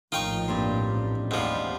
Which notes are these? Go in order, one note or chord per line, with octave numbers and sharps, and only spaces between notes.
A#1 A2 D#3 F3 D#4 F4 G5 C#6
G2 A#2 C4 C5
A1
D#2 G#2 F3 G3 B3 C4